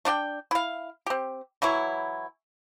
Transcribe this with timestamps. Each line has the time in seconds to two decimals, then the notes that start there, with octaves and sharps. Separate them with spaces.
0.05 A3 D4 D5 G5
0.51 E4 F5
1.06 C4 G4
1.62 E3 F#3 E4 C#5